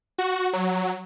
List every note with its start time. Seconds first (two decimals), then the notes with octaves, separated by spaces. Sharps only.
0.18 F#4
0.53 F#3